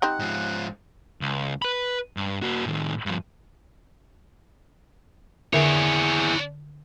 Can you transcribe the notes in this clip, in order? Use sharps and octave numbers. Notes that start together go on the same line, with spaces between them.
G3 C4 D#4 F#5
G#2 F3
C#2
B4 B5
G2
A#3 F#4
A2 D#3
G2 F3
D3 D4 E4 G#4 A#4 C#5 E5